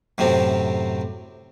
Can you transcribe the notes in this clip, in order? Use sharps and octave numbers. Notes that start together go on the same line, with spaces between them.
F#2 A2 C3 C4